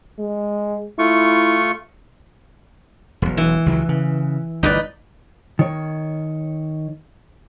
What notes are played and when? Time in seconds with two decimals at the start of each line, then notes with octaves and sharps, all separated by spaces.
0.19 G#3
0.99 A3 E4 F4 C#6
3.22 E1 B1
3.37 E3
3.66 C#2 D#3 F#3
3.89 C#3
4.63 G1 D2 E3 D#4 B4 D5
5.59 D#3 C#5